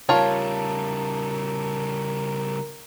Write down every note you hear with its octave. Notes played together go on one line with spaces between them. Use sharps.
C#3 G3 F4 A#4 C#5 A5